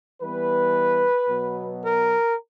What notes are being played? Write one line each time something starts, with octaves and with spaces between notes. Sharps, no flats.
E3 G3 B3 B4
B2 F#3 B3
A#4